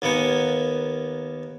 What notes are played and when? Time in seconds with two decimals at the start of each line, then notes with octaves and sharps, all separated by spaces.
0.02 D#2 A#3 B3 F#5 G#5